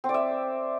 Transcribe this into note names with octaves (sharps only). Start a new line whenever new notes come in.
C4
D5
E5